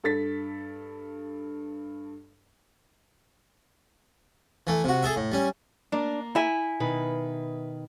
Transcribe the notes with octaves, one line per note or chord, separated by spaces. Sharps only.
G2 A4 A6 B6
E3 A3
C3 F#4
G#4 A4 E5
A2
G3 C#4
A#3 D4 A#4
E4 E5 G#5
B2 D#3 B4